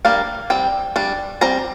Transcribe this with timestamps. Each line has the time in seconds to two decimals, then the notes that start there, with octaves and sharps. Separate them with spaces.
0.05 G3 A#3 D4 F5
0.50 G3 C4 G5
0.96 G3 D4
1.41 G3 C4 A#5